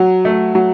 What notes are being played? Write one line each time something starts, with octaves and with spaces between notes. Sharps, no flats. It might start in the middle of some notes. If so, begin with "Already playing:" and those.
Already playing: F#3
A3
F#3